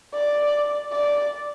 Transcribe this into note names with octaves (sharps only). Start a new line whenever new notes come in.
D5
D5